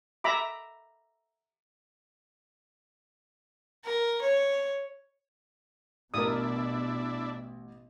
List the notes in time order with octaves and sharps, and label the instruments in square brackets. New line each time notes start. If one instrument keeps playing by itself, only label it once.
[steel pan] E5 A#5 B5 D6
[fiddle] A#4
C#5
[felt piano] A1 [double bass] B2 [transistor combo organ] D4 E4 [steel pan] A#4 D#6